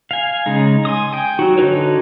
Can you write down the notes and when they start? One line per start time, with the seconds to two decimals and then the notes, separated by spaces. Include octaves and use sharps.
0.11 F5 G#5
0.46 C#3 G#3 D#4
0.85 G#5 C6 D#6
1.13 G5 G#5
1.39 F#3 D#4 F#4
1.58 D3 D#4 F#4 B4 C#5